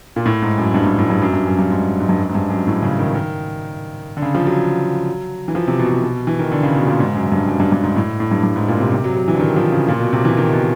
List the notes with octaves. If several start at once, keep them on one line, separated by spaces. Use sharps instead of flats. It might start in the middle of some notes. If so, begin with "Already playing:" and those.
A#2
A2
G#2
F#2
G2
A2
A2
G2
F#2
G2
F#2
G2
G#2
G#2
G2
F#2
G#2
G2
F#2
A2
C#3
D#3
D#3
D3
C#3
F3
F#3
E3
F3
C3
B2
B2
B2
E3
D#3
D3
C#3
B2
A#2
G#2
F#2
F#2
G2
F#2
G2
G2
G#2
A2
A2
G2
G2
G#2
A#2
C3
C3
F#3
F#3
E3
D3
D#3
F3
C#3
A#2
B2
C3
E3
D#3
B2